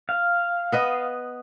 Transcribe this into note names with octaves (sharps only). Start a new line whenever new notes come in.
F5
B3 B4 D#5